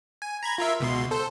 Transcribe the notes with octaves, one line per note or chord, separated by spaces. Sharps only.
G#5
A#5 B5 G#6
F4 A#4 E5
C#2 B2 C6
A4 C5